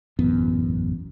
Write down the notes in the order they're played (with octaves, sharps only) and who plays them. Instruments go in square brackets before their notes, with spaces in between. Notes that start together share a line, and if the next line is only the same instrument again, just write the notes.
[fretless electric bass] E1 A1 F#2 B3